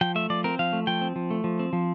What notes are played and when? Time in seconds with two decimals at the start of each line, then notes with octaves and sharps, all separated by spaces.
0.01 F3 G5
0.15 A3 E5
0.30 F3 D5
0.44 C4 A#4
0.59 F3 F5
0.73 A3
0.87 F3 G5
1.01 C4
1.16 F3
1.31 A3
1.44 F3
1.59 C4
1.73 F3